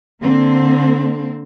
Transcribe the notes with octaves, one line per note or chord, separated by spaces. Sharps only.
D3 A#3 C4